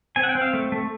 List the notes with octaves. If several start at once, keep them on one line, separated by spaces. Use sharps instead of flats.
C4 G#5
F#5
G5
C4
F5
A3
A3